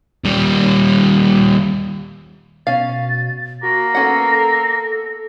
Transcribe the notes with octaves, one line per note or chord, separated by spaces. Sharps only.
D#2 G3
B2 C#4 F5 A6
A#3 F#4 A#6
B3 C#4 A4 F#5